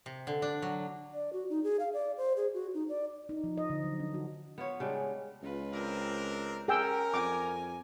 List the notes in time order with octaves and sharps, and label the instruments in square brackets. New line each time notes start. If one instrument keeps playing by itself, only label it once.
[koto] C3
D3
D4
F#3
[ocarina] D5
F#4
D#4
G#4
F5
D5
C5
G#4
F#4
D#4
D5
[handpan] D#4
F3
D#5
D3
F#3
D4
F#4
[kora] B3 F4 C#5
C#3 G3 G#3 D4
[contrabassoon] C#2 [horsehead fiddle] F4 B4
[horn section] C4 D4 A#4
[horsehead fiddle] C#4 [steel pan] G#4 G5 E6 [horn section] A#4
[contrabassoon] F2 [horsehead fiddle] G#5 [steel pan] D6